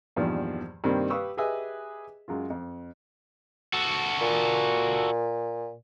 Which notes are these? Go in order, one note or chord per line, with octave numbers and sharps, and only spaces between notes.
E2 G2 A#2 D#3 F3
G2 C3 D#3 G3 A#3 C4
G4 B4 F5 C#6 D#6 E6
G4 G#4 B4 D#5 E5 G#5
F#2 G#3 F4
F2
F#4 A4
A#2